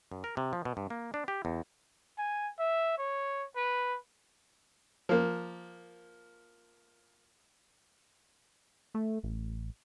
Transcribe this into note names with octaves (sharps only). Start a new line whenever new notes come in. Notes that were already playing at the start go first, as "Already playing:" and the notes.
F#2
A#4
C3
F3
B2
G2
A#3
D4
G4
E2
G#5
E5
C#5
B4
F3 A#3
A3
A1